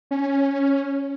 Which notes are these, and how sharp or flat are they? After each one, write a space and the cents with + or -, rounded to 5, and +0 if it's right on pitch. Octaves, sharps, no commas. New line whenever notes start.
C#4 +0